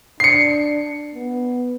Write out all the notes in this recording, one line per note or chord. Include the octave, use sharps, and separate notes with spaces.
D4 C7 C#7
B3